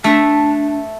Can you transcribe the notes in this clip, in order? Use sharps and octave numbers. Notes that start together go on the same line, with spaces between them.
A3 D4 E5